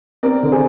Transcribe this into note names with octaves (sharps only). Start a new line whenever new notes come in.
C4 A#4 D5
D3
G#4 C5